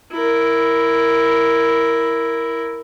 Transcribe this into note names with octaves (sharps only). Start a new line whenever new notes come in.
E4 A#4